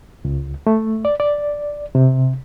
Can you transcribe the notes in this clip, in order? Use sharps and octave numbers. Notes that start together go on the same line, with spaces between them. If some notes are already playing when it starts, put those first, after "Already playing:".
C#2
A3
D5
D5
C3